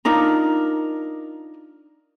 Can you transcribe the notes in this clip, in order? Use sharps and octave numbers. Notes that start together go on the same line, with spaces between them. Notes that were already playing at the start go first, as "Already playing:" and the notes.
D4 D#4 F4 A#4